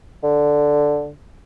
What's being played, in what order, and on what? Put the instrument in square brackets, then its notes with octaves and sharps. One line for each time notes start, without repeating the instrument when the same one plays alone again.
[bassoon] D3